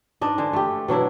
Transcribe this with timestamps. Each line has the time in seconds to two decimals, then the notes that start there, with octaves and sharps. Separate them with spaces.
0.21 G#2 D4 D#5
0.38 D3 G#3
0.53 A3 G4
0.88 B2 F#3 D4 E4